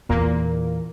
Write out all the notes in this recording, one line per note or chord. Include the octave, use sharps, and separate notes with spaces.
E2 A#2 A#3